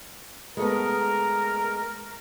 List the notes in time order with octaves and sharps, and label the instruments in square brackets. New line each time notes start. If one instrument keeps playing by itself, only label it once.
[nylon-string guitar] G#3 A3 B3 [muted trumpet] A#4